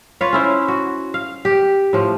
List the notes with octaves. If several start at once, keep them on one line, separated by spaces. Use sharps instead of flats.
F4 B4 C#5 F5
C#4 E4 C5
F#4
F5
G4
A2 F3